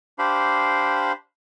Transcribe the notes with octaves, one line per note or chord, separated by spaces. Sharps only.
D4 G4 C5 F5 B5